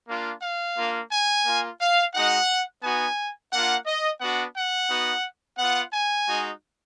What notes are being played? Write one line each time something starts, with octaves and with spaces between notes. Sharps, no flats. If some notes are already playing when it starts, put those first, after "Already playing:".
A#3 D4 F4
F5
A#3 D4 F4
G#5
A#3 F4
F5
G#3 D#4 F#4 F#5
B3 D#4 F#4 G#5
A#3 D4 F4 F#5
D#5
B3 D4 F#4 F#5
F#5
B3 D#4 F#4
B3 F4 F#5
G#5
G#3 D#4 F#4